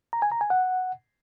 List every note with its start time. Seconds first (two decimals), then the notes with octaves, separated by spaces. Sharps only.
0.13 A#5
0.22 G#5
0.32 A#5
0.41 G#5
0.50 F#5